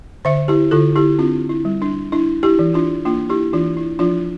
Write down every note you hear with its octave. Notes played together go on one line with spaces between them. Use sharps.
D3 C5 E5
E4 G4
D3 F4 A4
E4 G4
C4 D4 F4
E4
G3
D4
D4 E4
E4 G4
E3
D4 F4
A#3 D4 F4
E4 G4
E3 D4 F4
E4
F3 D4 F4